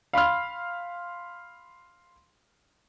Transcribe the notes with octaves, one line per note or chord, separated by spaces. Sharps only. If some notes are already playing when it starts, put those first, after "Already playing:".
F5 B5 C6 F6